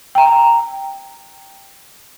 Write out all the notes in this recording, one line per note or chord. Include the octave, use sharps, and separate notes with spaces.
G5 A#5